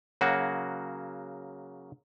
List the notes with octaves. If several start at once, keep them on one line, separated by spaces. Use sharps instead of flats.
C#3 F#3 A#3 F#4